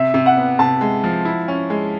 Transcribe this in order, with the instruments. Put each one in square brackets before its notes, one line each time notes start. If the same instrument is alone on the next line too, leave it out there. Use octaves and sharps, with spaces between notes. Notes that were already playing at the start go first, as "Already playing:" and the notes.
Already playing: [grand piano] C3 [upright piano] E5
[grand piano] C3
[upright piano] F#5
[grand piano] B3
[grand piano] C3 [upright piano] A5
[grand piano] G#3
F3
E4
C#4
G#3